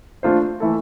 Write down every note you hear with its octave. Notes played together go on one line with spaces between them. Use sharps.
A3 D4 F4 A4 C5
E3 A3 E4 A4